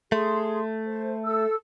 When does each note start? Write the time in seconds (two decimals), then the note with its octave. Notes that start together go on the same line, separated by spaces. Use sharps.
0.12 A3 G#4 C6
0.86 C5
1.25 A4 E6